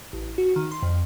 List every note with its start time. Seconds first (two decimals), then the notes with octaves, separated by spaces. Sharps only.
0.13 A1
0.38 F#4
0.56 D#3
0.71 C6
0.83 F2